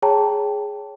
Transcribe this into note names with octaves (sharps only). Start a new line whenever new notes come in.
G#4 C#5 G5 A5 A#5